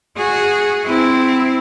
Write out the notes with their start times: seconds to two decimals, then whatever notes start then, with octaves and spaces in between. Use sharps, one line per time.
0.17 F#4 G#4
0.86 C4 E4